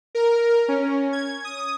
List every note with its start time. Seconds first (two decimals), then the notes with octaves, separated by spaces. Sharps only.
0.15 A#4
0.68 C#4
1.13 G#6
1.44 D#6